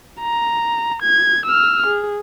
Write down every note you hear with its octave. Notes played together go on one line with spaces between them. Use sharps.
A#5
G#6
E6 F6
G#4